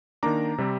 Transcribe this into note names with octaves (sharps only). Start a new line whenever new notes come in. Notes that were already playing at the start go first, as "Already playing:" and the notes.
D#3 A#3 D4 A#5 D6
C3 G3 C4